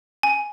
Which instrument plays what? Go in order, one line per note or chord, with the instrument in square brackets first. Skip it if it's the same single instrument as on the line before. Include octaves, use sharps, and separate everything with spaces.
[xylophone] G#5